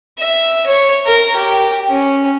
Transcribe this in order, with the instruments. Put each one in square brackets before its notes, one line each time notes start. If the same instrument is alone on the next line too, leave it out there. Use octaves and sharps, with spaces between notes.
[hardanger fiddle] E5
C#5
A#4
G4
C#4